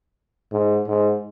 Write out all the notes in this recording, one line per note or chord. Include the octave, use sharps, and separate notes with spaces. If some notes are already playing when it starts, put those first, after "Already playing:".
G#2
G#2